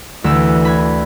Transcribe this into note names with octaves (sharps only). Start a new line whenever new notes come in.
D2 E3 E6
B5 G#6